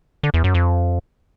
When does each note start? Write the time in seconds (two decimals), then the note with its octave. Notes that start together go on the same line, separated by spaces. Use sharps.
0.23 D3
0.34 E2
0.44 F#2
0.54 F2